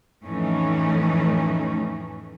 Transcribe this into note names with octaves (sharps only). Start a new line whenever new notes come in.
F2 A2 E3 A3 C#4 D#4